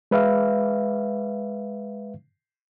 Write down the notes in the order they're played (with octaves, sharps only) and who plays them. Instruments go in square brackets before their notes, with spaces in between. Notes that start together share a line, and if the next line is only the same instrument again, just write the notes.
[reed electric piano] G#3 B4 E5 F5